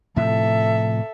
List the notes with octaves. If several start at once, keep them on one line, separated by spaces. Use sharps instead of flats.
A2 C3 F3 A4 E5